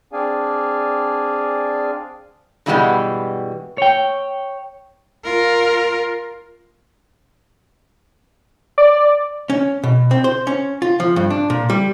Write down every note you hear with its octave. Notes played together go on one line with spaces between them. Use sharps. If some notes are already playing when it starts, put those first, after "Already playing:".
C4 D4 G#4 D5 F5 G#5
G2 B2 E3 G3 G#3 B3
C#5 G5
F4 A#4
D5
C#4
B2
C4
C5
C#4
F4
F3
G2
D4
A#2
G3